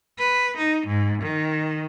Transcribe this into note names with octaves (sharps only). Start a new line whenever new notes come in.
B4
D#4
G#2
D#3